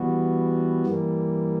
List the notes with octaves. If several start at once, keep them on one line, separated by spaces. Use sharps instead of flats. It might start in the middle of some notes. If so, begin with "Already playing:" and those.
Already playing: E3 G3 B3 F#4
G2 E3 G3 A#3